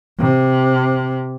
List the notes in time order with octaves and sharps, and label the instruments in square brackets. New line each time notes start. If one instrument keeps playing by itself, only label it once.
[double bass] C3